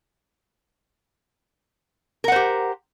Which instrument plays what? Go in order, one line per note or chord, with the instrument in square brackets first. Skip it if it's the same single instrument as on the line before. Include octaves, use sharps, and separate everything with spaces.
[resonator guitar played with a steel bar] A#4
F#5
C5
G4